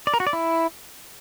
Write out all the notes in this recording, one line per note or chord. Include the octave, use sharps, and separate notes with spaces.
D5
A#4
F#4
D5
E4